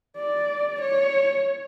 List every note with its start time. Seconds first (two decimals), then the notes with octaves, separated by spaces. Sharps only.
0.17 D5
0.81 C#5